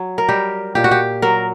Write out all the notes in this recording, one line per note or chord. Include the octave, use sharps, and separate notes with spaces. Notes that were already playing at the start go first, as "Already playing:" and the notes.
Already playing: F#3
A#4
G3 G4
A#2 G4
F#4
G4
F#3 A#4